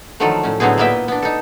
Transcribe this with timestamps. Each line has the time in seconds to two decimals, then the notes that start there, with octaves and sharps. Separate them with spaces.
0.20 D3 D#3 F3 F#3 A3 A4
0.43 A2 C#4
0.60 A2 D3 F#3 B3 C4 G#4
0.78 A#2 A#3 B3 E4 E5 G5
1.08 B3 D4
1.22 D#4 A4